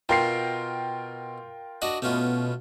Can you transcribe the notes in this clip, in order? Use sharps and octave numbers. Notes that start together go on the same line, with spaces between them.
B2 F4 A#4 G5 C6 C7
D4 F#4 D#5
B2 A3 C#4 F4